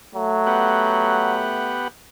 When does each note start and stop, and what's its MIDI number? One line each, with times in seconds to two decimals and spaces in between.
0.15 1.43 54
0.15 1.84 57
0.47 1.88 59
0.47 1.88 67
0.47 1.88 78